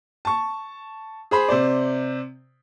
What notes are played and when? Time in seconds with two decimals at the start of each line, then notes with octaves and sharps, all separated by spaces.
0.25 A5 C#6
1.31 G#4 C5 B5
1.48 C3 C5 D5